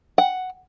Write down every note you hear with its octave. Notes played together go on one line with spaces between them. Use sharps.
F#5